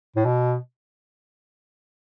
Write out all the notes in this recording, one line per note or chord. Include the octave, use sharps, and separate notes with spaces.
A2
B2